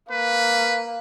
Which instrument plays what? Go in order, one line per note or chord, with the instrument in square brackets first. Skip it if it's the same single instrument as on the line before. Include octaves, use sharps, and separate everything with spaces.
[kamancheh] A#3 [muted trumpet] B4